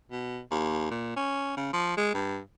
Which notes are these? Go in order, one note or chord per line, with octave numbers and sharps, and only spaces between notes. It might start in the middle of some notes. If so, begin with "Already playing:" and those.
B2
D#2
A#2
C#4
C#3
F3
G#3
G2